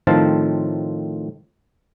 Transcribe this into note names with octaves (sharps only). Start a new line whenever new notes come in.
A2 D#3 F3 C4 F5 A5